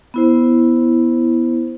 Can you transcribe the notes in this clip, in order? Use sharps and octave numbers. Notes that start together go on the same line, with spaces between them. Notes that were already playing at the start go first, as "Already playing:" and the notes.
B3 E4 C5